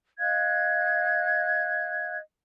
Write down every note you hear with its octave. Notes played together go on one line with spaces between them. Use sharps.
D#5 F5 F#6 G#6